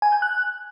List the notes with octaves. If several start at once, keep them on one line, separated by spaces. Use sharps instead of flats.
G#5
G6
F#6